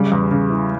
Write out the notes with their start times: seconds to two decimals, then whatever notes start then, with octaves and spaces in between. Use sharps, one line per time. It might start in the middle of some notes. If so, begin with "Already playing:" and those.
Already playing: C#3 G3
0.12 E2
0.31 C#3
0.50 E3